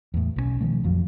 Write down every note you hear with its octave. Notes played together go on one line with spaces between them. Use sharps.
E2 A2
B1 D#3 C#4
B2 D#3 F3 A3
A1 F2 F3 F#3